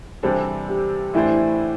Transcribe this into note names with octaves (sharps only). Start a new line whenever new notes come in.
C3 E3 G3 D4 A4 C5
G4
A2 E3 A3 D4 E4 C5